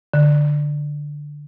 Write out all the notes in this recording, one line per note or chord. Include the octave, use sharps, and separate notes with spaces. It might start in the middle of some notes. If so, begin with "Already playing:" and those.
D3